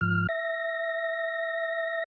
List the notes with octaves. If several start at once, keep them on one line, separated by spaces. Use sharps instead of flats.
G#2 F3 F6
E5 A#6